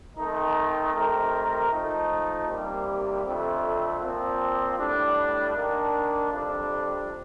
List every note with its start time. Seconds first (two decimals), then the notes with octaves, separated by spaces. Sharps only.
0.17 D#3 A3 C4 D#4
0.94 D#3 A3 C4 G4 A#4
1.70 F3 A3 D#4
2.48 C3 D#3 G3 A#3
3.25 F2 D3 A3 C4
4.01 A#2 F3 C4
4.78 A2 G3 D4
5.54 D#3 A#3 D4
6.31 F2 C3 G3 D4